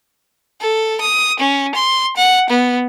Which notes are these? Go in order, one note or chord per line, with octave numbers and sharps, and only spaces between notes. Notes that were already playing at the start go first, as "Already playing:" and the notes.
A4
D#6
C#4
C6
F#5
B3